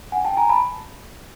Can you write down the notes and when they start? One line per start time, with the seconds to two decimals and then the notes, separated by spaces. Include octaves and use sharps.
0.12 F#5 G#5
0.25 G5 A5
0.37 G#5 A#5
0.49 A5 B5